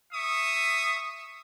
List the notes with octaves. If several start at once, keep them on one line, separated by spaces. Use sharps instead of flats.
E5 C#6 D#6